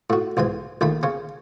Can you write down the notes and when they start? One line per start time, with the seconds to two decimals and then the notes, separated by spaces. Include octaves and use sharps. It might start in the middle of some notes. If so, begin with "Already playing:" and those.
0.10 A2 F#4
0.37 B1 G#2 E3 G#5
0.81 A#1 D#3 A3 B5
1.03 C#3 C#4